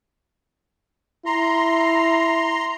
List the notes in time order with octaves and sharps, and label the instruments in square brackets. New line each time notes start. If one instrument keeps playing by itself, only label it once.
[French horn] E4 [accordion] A#5 C6